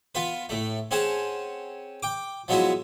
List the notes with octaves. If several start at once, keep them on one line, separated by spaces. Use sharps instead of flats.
B3 F4 B4
A2 A3
C4 C#4 G#4 F#5 A5
G5 D6
F3 F#3 G#3 B3 E4 F#4